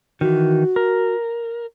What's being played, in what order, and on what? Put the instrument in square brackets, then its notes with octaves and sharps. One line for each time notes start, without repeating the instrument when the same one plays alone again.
[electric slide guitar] D#3 E3 [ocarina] F#4
[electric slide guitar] A#4